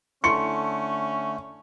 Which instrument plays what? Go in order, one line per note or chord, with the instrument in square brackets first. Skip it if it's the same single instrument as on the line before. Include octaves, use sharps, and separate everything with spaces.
[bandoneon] D3 A3 [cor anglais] C#4 [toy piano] E4 C6 C#6 [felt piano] C#7